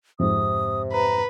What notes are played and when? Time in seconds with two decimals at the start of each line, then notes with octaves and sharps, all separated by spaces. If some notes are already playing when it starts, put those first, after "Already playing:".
0.20 F2 G#2 C3 D#6
0.92 B4 A#5